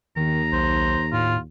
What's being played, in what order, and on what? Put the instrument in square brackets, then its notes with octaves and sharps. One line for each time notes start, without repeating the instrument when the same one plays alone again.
[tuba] D#2 [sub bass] D#3 [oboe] A#5
[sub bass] B1 [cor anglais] C5
[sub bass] A2 [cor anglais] F4